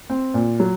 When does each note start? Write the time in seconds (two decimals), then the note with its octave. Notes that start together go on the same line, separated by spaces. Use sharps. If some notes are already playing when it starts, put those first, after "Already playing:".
0.10 C4
0.34 A#2
0.60 F#3